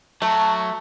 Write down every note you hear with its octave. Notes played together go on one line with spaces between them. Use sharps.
F#3 A3 A5